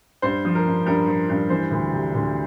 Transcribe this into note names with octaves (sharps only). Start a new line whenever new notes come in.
G2 C5
F3
A#4
G2
G2 A#4
F3
G2
E3 C5
D2
C3
D2